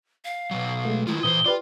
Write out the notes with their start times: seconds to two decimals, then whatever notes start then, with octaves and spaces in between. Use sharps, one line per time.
0.25 F5
0.51 B2 F#3
0.85 G#3 A3
1.07 D#3 E4 F4
1.23 A#2 E3 A#4 C5 D#6 G7
1.46 F4 G4 B4 D5